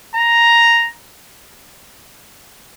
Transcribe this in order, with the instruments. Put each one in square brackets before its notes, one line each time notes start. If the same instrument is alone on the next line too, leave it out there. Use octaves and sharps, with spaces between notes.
[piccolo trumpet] A#5